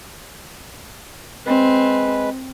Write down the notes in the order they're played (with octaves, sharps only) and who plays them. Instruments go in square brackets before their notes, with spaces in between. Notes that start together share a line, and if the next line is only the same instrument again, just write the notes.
[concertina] G#3 B4 [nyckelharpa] C4